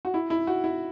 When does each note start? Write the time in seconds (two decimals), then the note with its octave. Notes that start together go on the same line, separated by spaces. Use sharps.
0.05 F#4
0.14 E4
0.30 E4
0.47 F#4
0.64 E4